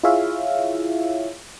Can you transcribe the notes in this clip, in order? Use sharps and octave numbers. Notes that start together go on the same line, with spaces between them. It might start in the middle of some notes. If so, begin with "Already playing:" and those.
E4 F4 G#4 C#5 E5 F5